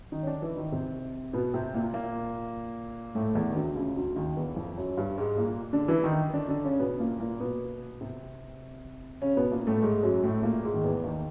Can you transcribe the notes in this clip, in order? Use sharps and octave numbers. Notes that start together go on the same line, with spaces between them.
D#3 D#4
C#4
D3 D4
E3 E4
D#3 D#4
C3 C4
B2 B3
C3 C4
A#2 A#3
A#2 A#3
A2 A3
E2 E3
D#3
D2 D3
C#2 C#3
D2 D3
D#2 D#3
E2 E3
F2 F3
F#2 F#3
G2 G3
G#2 G#3
A#2 A#3
D3 D4
E3 E4
D#3 D#4
D3 D4
D3 D4
C#3 C#4
B2 B3
A#2 A#3
A#2 A#3
B2 B3
C3 C4
C#3 C#4
B2 B3
A#2 A#3
A2 A3
G#2 G#3
F#2 F#3
A2 A3
A#2 A#3
G#2 G#3
D#3
E2 E3
D#2 D#3